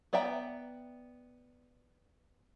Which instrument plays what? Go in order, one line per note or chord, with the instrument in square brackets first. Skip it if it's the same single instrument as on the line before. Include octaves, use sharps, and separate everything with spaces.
[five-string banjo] B3 D5 E5 G5 A#5